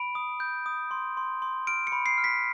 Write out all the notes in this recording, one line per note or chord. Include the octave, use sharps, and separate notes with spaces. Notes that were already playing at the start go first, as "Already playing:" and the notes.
Already playing: B5 D7
D#6
G6
D#6
C6
C6
C6
F6 D7
C#7
B5
C7
F6
B6